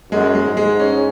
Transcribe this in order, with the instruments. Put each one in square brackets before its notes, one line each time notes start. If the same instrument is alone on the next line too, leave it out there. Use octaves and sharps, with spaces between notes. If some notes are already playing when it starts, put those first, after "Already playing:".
[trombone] F#2 [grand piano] G#3
[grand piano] G#3
[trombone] G#2
[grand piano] G#3
C#4